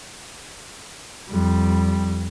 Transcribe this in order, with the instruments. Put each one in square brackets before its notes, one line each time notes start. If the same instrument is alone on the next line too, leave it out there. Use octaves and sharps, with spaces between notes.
[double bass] F2 G3